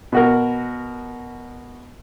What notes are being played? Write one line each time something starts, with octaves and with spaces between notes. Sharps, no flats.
B2 F#4 A#4